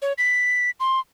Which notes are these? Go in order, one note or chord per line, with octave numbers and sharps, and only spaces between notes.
C#5
B6
C6